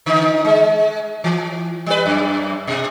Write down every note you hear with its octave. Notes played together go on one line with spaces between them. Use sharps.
D3 D#4
G#3
E3
G3 B4
F#2
B2